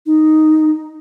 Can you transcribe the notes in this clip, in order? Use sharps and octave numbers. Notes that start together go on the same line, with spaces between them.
D#4